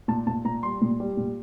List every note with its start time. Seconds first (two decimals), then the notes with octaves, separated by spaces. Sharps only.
0.08 A#2 A5
0.27 A#2 A5
0.45 A#2 A#5
0.63 G3 C6
0.82 A#2
1.00 G3
1.17 A#2